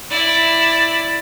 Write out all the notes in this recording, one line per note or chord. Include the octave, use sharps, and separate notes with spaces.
E4 D5